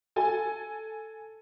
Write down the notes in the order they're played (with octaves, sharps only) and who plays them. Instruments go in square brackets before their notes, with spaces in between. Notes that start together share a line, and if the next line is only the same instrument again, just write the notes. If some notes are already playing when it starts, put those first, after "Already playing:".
[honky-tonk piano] A4 G#5